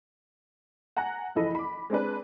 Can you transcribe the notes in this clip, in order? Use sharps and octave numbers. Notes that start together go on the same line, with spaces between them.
F#5 G#5 A#5 F#6
F#1 E3 F3 A4 D#5 B5
B5 D6
G#3 C4 D4 B4